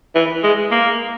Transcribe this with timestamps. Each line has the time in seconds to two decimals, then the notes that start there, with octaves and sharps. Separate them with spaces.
0.15 E3
0.43 G#3
0.71 A#3